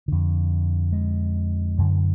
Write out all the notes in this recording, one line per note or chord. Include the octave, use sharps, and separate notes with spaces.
F2 D3
G#3
F#2 D3